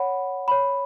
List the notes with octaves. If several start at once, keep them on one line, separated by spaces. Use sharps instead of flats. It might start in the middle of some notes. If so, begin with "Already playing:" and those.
Already playing: C#5 F#5 B5
C#5 B5